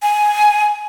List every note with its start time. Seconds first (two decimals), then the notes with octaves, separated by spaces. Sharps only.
0.02 G#5